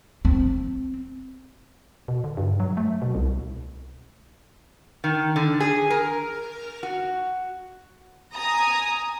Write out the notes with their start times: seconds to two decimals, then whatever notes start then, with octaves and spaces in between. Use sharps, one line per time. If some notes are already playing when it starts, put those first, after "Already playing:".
0.25 C4
2.08 B2
2.24 D3
2.37 G2
2.60 F#3
2.77 A3
3.02 B2
3.15 C2
5.04 D#3
5.36 D3
5.60 G#4
5.90 A#4
6.83 F#4
8.35 G#5 A#5 D#6